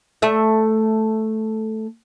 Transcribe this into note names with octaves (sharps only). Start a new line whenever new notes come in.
A3 E5